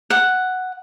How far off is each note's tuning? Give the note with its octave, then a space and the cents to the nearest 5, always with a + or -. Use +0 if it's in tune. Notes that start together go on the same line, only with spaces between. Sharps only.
F#5 +0